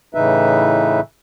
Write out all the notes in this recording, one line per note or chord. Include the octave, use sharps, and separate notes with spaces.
A2 C#3 E3 D#4 B4 E5